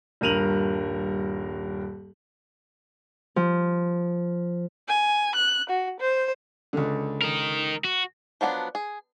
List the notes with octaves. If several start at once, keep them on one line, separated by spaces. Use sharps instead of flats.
D#1 G2 A#4 D#7 F7 F#7
F3
G#5
F#6
F#4
C5
C#2 D3
D#4 A#4
F#4
F3 F#3 B3 D4
G#4